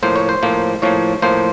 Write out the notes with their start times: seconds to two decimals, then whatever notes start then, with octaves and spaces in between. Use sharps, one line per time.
0.03 A2 F3 A#3 C5
0.16 C#5
0.29 C5
0.43 A2 F3 A#3
0.82 A2 F3 A#3 C#5
1.22 A2 F3 A#3 C5